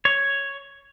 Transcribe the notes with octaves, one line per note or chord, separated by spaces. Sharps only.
C#5